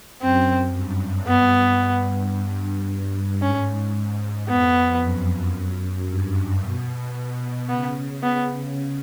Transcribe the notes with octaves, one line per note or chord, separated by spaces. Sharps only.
F#2 C4
G2
B3
G2
G#2 C#4
F2 B3
F#2
G2
B2
C#3 B3
B3